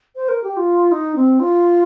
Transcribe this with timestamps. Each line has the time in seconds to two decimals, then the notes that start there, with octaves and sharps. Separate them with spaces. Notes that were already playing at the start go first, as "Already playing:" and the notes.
0.16 C5
0.29 A#4
0.44 G4
0.57 F4
0.92 D#4
1.16 C4
1.40 F4